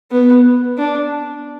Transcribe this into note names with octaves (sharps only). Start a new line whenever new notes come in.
B3
D4